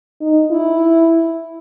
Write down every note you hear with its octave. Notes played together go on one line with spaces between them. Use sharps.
D#4
E4